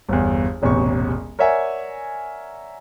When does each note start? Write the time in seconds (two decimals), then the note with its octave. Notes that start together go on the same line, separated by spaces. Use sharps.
0.09 G1 E2
0.62 E1 A1 E2 C3 C#6
1.39 A#4 C#5 D5 E5 F#5 G#5